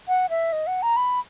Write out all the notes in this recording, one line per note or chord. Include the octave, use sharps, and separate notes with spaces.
F#5
E5
D#5
F#5
A#5
B5